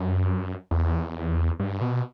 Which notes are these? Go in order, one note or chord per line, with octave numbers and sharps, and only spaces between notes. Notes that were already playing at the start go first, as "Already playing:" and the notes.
Already playing: F#2
E2
G2
B2